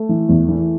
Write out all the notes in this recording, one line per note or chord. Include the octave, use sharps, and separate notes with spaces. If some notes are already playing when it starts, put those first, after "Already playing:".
Already playing: A3
E3
E2
E3